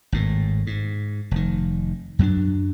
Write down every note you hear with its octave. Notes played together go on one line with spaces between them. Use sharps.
G#1 A2
G#2
F1 D#3
F#2 F#3 G3 D4